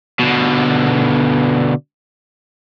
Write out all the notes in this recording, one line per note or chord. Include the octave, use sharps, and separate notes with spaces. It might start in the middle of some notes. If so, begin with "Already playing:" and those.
B2 D3